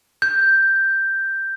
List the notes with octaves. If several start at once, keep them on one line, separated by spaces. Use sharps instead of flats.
G6